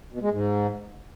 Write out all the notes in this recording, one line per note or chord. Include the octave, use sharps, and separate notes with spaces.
B2
G#3
G#2